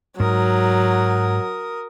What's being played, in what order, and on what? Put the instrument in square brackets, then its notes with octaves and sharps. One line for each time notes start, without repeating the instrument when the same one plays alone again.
[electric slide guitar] G#2 [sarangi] F#3 [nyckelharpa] A#4 D#6